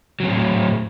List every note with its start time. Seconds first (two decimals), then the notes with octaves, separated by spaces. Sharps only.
0.20 F#3
0.23 C4
0.27 A2